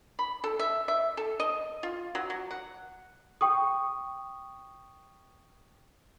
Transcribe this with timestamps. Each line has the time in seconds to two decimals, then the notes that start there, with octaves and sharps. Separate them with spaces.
0.19 B5
0.44 A4
0.59 E5
0.88 E5
1.17 A4
1.40 D#5
1.83 F4
2.15 F#3
2.30 F#3
2.51 F#5
3.41 G5 C#6 D#6